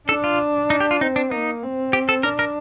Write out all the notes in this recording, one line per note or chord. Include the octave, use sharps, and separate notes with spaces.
D4 A4
F4
D#4
G4
F4
C4 D#4
D4
A#3 D#4
C4
G4
A4
D4 A#4
A#4